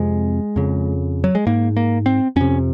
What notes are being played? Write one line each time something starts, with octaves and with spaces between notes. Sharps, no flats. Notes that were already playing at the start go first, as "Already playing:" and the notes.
Already playing: F2 C3 G#3
F2 C#3
F#3
G#3
G#2 A#3
A#3
C4
F2 C3 C#4